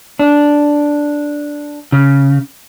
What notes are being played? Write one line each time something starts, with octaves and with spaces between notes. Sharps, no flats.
D4
C#3